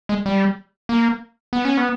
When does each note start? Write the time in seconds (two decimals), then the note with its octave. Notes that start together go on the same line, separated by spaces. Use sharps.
0.09 G#3
0.26 G3
0.89 A#3
1.53 B3
1.65 C#4
1.77 B3